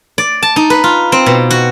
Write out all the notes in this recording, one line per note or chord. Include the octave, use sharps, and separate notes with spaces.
D5
A5
D#4
B4
F4
C4
B2
F#4